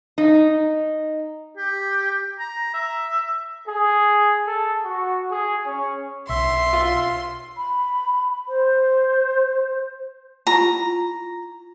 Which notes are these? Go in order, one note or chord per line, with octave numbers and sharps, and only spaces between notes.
D#4
G4
A#5
E5
G#4
A4
F#4
G#4
C#4
B1 E5 C6
F4
B5
C5
E4 F4 A#5 C#6